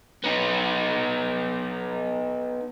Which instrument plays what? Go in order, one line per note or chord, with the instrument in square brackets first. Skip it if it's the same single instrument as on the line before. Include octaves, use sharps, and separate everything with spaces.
[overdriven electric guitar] B3 D#4